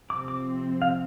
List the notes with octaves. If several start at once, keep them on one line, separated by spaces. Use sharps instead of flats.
C3 F3 C4 D6
D6
F5